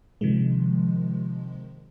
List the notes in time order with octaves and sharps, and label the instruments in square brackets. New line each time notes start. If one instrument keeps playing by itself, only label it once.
[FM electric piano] C3 D#3 F3 G#3